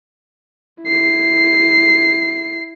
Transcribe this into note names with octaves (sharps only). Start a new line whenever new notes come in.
E4 C7